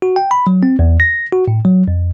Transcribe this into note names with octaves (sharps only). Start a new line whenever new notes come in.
F#4
G5
B5
F#3
C4
E2
A#6
F#4
A2
F#3
F2